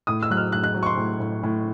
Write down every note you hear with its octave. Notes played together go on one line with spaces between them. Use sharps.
A2 D#6
E6
F#3 F#6
F6
A2 F#6
F#6
F#3
C#6
C6
A2
A2
A2